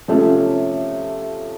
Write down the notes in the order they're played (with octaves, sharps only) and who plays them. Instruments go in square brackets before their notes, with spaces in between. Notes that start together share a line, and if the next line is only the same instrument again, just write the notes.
[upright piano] C3 F3 A3 C#4